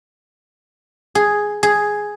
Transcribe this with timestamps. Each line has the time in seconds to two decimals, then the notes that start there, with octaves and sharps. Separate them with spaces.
1.15 G#4
1.63 G#4